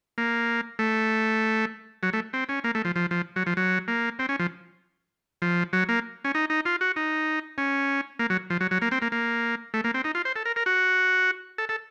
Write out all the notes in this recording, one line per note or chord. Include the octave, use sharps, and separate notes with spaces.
A#3
A3
F#3
A3
C4
C#4
A#3
A3
F3
F3
F3
F#3
F3
F#3
A#3
C4
C#4
F3
F3
F#3
A#3
C#4
D#4
D#4
F4
F#4
D#4
C#4
A#3
F#3
F3
F#3
F#3
A#3
C4
A#3
A#3
A3
A#3
C4
D#4
F4
C5
A4
A#4
A#4
F#4
A4
A4